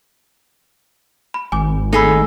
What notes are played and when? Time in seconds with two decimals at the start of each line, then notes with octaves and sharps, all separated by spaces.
1.34 B5
1.52 G#1 G#5 D6
1.93 A3 D#4 G#4 A4 G#5 B5 E6